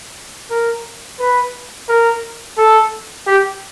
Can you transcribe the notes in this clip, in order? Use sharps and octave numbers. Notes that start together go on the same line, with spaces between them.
A#4
B4
A#4
A4
G4